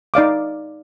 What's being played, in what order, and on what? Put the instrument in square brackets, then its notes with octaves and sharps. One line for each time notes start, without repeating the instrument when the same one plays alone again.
[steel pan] D#4 D5 F5 D6